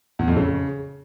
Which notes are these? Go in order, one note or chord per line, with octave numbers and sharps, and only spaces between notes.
E2
F2
C#3